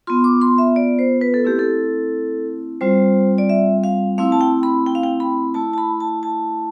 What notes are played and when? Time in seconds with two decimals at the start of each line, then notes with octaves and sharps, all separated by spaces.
0.07 B3 F4 C6
0.24 D6
0.41 C6
0.58 E5
0.76 D5
0.99 C5
1.21 B4
1.34 A4
1.44 A3 C4 E4 G4
1.59 A4
2.81 G3 C4 F4 C5
3.38 D5
3.50 E5
3.84 F5
4.18 A3 C4 E4 F5
4.32 A5
4.41 G5
4.63 B5
4.87 G5
4.95 F5
5.03 G5
5.20 B5
5.54 A3 E4 A5
5.73 A5
5.78 B5
6.00 A5
6.23 A5